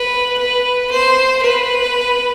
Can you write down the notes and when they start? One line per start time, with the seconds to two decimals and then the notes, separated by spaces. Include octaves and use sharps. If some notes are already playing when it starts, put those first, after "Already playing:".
Already playing: B4
0.39 B4
0.92 C5
1.43 B4